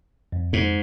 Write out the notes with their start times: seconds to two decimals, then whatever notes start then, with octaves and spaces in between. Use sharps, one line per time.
0.32 F2
0.53 G#2